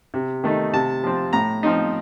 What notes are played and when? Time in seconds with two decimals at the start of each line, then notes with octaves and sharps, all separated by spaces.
0.14 C3
0.44 D#3 A3 D#4
0.73 C3 A5
1.04 F3 C4
1.33 A2 A#5
1.63 F3 C4 D#4